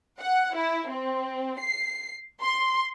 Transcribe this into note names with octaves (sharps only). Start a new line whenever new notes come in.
F#5
E4
C4
C7
C6